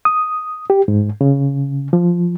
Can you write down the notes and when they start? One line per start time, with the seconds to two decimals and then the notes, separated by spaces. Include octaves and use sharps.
0.05 D#6
0.70 G4
0.88 G#2
1.21 C#3
1.93 F3